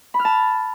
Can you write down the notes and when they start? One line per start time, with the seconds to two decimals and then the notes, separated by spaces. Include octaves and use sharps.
0.14 B5
0.19 F6
0.25 A5